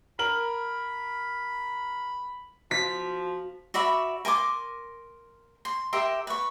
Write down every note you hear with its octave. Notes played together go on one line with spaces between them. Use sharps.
A#4 B5 F#7
F3 F#4 B6
F#4 D5 E5 B5
A#4 G#5 C6 D6
C6
G4 A#4 E5 C6
B4 C#6